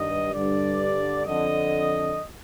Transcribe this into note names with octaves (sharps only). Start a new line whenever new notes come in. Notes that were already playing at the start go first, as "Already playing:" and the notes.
Already playing: G2 D#3 D#5
G2 D3 D5
F2 D3 D#5